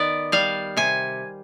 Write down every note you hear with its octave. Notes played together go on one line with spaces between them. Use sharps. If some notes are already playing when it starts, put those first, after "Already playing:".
Already playing: D#3 B3 D5
G3 F5
C3 G#5